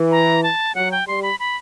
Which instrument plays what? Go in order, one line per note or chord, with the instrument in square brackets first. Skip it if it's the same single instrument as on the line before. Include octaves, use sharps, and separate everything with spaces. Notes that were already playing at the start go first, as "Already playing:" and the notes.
Already playing: [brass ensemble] E3
[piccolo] A#5
A5
[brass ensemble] F#3 [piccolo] F#5
[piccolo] G5
[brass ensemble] G3 [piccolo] C6
[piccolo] B5
B5